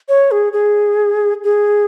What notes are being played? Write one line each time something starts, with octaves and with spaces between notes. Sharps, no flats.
C#5
G#4
G#4
G#4